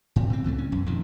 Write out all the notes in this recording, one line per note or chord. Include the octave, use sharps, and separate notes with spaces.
A2
E3 C4
C#2 E3 F#3 A3
C#4
B1 F#2
F2 A#2 D#3